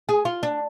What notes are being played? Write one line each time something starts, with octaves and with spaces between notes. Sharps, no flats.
G#4
F4
D4